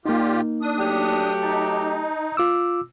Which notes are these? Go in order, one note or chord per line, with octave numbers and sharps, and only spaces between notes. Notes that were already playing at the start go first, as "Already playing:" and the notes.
A#2 A#3 D#4 F4 G4
D4 D#6
F#3 A3 G4
D#4 A5
F4 D6 E6